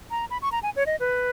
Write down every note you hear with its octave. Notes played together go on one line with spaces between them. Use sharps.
A#5
B5
C#6
A#5
G#5
C#5
D#5
B4